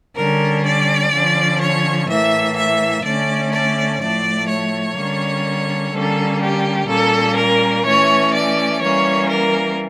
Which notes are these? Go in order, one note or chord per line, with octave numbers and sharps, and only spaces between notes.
D3 G3 C#4 A#4
D5
D3 F3 C#4
C#5
A2 E3 A#3 E5
E5
D3 A3 C#4 D5
D5
A2 F3 A3 D5
C#5
D3 G3 A#3 C#4
D3 G3 A#3 C#4 A4
G4
A#2 G3 A#3 C#4 A4
A#4
E3 A3 C#4 C#5
D5
E3 G3 A#3 C#4 C#5
A#4